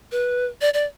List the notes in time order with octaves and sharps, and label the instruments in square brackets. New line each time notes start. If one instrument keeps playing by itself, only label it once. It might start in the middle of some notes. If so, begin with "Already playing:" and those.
[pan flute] B4
D5
D5